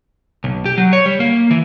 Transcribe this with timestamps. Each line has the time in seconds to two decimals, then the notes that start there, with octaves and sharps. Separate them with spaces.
0.44 B1
0.66 G4
0.78 F#3
0.93 C#5
1.06 G3
1.20 A#3
1.51 E3